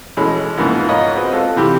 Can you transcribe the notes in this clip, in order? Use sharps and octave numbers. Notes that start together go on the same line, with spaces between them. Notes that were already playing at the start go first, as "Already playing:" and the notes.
B2 E3 G#3 A3 C#4
G#2 C#3 F3 A#3 B3 E4
F4 A#4 C#5 D#5 F#5 B5
C4 F#4 G#4 B4 D#5
G#3 F4 A4
C3 E3 G4